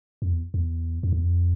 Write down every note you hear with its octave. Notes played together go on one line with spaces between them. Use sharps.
F2
E2
E2
F2
E2
F2